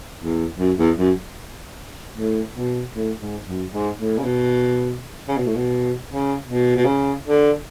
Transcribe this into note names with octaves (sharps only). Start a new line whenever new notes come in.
E2
F#2
E2
F#2
A2
B2
A2
G#2
F#2
G#2
A2
C#3
B2
C#3
B2
A2
B2
C#3
B2
B2
C#3
D3